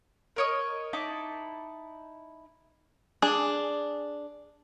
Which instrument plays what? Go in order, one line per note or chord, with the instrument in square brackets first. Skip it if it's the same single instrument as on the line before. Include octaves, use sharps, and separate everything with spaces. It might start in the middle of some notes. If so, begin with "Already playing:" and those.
[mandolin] A#4 C#5 D#5
D#4 E4 A5 D6
[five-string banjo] D4 G#4